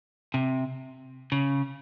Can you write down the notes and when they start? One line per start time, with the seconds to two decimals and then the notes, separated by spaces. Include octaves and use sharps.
0.34 C3
1.32 C#3